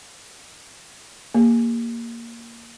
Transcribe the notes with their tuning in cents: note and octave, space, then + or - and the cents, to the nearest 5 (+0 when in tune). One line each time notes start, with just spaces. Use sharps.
A#3 +0 G#4 -40